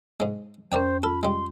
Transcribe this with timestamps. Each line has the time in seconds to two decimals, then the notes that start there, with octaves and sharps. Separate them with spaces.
0.20 G#2 G#3
0.72 F2 C#4 A#4 C5 D5 G5
1.03 F4 A4 B5
1.23 G3 G#3 C6